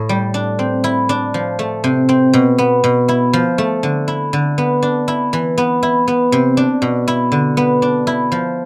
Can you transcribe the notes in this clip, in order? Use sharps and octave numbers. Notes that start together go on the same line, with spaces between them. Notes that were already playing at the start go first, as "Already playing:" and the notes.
Already playing: A2 A3
G3
D4
C4
E4
D4
F3
A3
C3
C4
B2
B3
B2
E4
F3
A3
D3
E4
D3
B3
D4
E4
E3
B3
E4
B3
C3
D4
B2
E4
D3
B3
D4
E4
F3